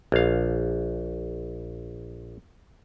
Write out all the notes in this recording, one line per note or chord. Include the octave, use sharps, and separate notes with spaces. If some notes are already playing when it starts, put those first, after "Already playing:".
A#1 F5